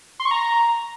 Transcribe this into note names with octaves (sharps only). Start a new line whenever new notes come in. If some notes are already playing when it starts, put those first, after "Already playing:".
C6
C#6
A#5